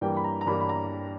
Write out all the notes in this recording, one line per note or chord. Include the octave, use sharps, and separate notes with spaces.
G2 E3 G3 A#3 G5
B5
A#5
A#5
G2 E3 G3 A#3 B5
B5
A#5